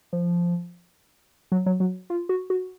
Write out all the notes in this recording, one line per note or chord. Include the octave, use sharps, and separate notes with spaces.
F3
F#3
F#3
F#3
F4
F#4
F#4